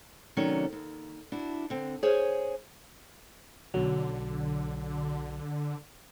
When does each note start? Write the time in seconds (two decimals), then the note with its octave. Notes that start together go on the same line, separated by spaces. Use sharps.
0.37 C3 D#3 F#3 A3 C#4 D5
0.73 D#2
1.32 D4 E4 F#4
1.70 D3 C4
2.03 G#4 C5 C#5 G#5
3.74 B1 D3 F#3